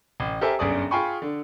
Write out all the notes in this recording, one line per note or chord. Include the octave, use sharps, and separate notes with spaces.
A1
G4 A4 A#4 C5 E5 G#5
G1 F#2 G#4 D5 D#6
F4 G#4 G5 G#5 B5 C#6
D3